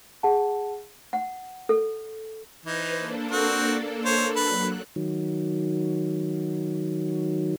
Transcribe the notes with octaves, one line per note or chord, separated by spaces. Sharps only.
G#4 F#5 A5
F#5
A4
E3 D#4 B4 C5
A#3 D4 A4
C4 F#4
C5 C#5
F#3 B4 F#6
D#3 F#3